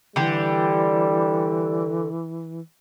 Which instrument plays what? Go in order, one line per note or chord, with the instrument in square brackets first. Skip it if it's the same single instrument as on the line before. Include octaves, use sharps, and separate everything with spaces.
[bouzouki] D3 G4 [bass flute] E3 [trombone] G3